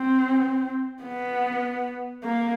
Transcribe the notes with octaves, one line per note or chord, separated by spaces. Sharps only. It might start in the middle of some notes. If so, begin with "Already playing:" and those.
Already playing: C4
B3
A#3